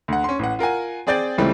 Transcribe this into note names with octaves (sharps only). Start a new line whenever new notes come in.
D2 F#5
C#4 C6
A1 F#5
F4 A#4 F#5 G#5
C4 G#4 D5 G5 G6 A6
C#2 C#3 E3 G3 A3 C4